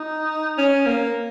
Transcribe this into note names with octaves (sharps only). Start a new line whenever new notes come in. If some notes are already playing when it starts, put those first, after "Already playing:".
Already playing: D#4
C#4
A#3